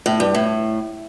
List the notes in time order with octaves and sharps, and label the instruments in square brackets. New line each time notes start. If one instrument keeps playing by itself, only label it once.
[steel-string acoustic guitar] A2
G2
A2